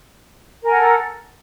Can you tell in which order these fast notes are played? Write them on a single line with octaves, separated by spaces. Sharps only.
A#4 G#5 F#5 A4